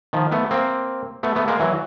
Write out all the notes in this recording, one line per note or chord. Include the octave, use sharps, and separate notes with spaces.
D#3 F3
A3 B3
A#3 C4
A3 B3
A3 B3
G#3 A#3
E3 F#3